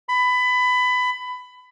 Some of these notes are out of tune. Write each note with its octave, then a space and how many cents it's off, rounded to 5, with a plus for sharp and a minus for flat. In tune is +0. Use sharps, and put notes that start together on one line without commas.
B5 +20